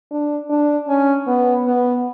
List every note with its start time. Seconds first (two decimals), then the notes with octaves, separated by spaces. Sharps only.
0.11 D4
0.50 D4
0.88 C#4
1.27 B3
1.65 B3